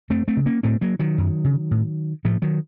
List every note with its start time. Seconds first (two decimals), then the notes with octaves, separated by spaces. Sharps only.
0.10 F#2 A3 C4
0.28 A3 C4
0.37 C#3
0.46 A#3 C#4
0.63 A2 A3 C4
0.81 F#3 A#3
0.99 D#3 F#3
1.18 F#2
1.44 C#3
1.71 A2
2.24 A2 F3 A3
2.42 D#3 F#3